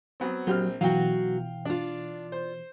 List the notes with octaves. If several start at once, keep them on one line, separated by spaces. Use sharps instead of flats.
F#3 B3 C4
A#1 F#3 C4 F#4 G4 F6
B2 E3 F#3 F#4 F5 G5
D4 F4 D5
C5